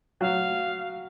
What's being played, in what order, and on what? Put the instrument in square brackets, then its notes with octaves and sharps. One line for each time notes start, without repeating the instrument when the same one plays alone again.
[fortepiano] F#3 [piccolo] F5